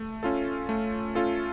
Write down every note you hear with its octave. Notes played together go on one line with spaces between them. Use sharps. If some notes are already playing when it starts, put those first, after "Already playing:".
Already playing: A3
C#4 F4 A4
A3
C#4 F4 A4